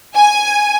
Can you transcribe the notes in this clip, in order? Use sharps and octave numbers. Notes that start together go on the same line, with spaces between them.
G#5